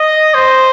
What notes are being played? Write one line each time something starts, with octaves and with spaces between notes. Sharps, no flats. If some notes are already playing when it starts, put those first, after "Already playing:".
Already playing: D#5
C5